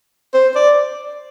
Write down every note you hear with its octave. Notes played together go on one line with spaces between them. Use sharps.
C5
D5